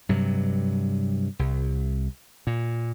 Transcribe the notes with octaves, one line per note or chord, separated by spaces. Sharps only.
G2 C3 F#3
C2
A#2